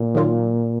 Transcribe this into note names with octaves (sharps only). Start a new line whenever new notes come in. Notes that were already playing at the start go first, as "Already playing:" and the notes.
Already playing: A#2
D#3 F#3 A#3 F4